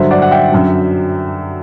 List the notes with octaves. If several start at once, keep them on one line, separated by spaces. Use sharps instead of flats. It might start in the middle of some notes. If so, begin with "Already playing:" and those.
Already playing: G2 D3 F#3 C5 E5
D5 F#5
F#5
E5 G5
F#2 D3 F#3